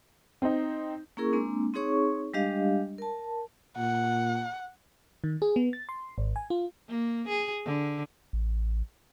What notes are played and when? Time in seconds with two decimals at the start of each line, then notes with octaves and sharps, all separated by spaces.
0.42 C4 D#4
1.17 A#3 C#4 E4 G#4 A#4 C#6
1.32 G#3 A#3 C4 D4
1.74 C4 D#4 G#4 C#5 C#6
2.34 G3 G#3 D4 G4 D#5 F5
2.98 A#4 A5
3.77 A#2 F#5
5.24 D#3
5.42 G#4
5.56 B3
5.73 A6
5.89 C6
6.18 G#1
6.36 G#5
6.50 F4
6.89 A#3
7.28 G#4
7.65 D3
8.33 A1